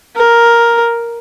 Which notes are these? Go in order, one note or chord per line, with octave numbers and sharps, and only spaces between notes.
A#4